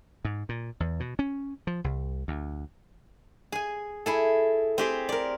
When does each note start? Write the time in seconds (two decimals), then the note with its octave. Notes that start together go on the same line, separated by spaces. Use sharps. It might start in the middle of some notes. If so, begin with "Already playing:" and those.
0.25 G#2
0.49 A#2
0.80 E2
1.00 B2
1.19 C#4
1.67 F3
1.84 C2
2.28 D2
3.52 G#4 G#5
4.06 E4 G#4 A4
4.78 C4 G4 G#4
5.09 A#4 D5